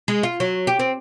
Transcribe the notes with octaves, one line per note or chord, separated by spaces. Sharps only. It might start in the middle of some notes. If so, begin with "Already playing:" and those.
G#3
F4
F#3
G4
C4